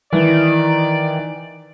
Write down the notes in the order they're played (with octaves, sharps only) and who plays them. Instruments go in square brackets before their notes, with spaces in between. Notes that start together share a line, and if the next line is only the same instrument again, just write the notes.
[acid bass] D#3 [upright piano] E3 [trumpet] D5